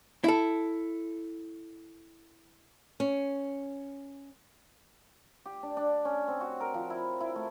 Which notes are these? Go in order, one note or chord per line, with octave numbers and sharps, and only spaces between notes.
E4 A4
C#4
G4
D4
D4
C#4
C4
F#4
A#4
F3
E4
E4
A3